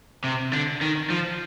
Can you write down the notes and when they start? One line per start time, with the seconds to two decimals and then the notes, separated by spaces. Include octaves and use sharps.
0.24 C3
0.53 D3
0.82 D#3
1.10 F3